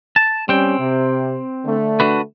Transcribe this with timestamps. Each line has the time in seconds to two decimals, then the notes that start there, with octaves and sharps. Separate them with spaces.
0.16 A5
0.49 G3 C4 C#4 G5
0.79 C3
1.65 D3 A3
2.00 D4 F#4 B4